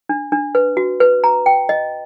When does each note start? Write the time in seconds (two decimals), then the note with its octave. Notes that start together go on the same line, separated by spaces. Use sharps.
0.09 D4
0.32 D4
0.55 B4
0.77 F#4
1.00 B4
1.24 A#5
1.46 G5
1.69 D#5